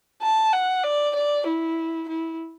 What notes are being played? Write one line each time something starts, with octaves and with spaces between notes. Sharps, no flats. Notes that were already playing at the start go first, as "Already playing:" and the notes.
A5
F#5
D5
D5
E4
E4